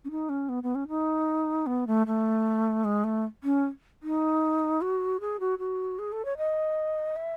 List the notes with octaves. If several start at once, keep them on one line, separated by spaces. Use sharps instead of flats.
C#4
D#4
C#4
B3
B3
C#4
D#4
B3
A3
A3
G#3
A3
C#4
D#4
F#4
G#4
F#4
F#4
G#4
A4
C#5
D#5
E5